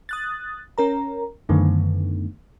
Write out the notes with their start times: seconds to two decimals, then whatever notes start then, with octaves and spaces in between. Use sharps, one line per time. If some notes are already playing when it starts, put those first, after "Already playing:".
0.09 D#6 F#6 A6
0.78 C#4 A#4 A#5
1.49 F#2 D3 D#3 A3 B3